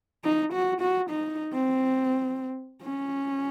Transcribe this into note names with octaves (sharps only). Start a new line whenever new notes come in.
D#4
F#4
F#4
D#4
C4
C#4